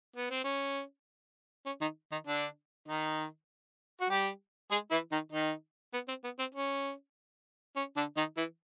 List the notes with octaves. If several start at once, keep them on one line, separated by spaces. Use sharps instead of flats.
B3
C4
C#4
C#4
D#3 D#4
D#3 D#4
D3 D4
D#3 D#4
F#4
G3 G4
G#3 G#4
E3 E4
D#3 D#4
D#3 D#4
B3
C4
B3
C4
C#4
C#4
D3 D4
D#3 D#4
E3 E4